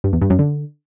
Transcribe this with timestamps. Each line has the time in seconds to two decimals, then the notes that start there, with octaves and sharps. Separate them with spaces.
0.04 G2
0.13 E2
0.21 G2
0.30 F#2
0.39 D3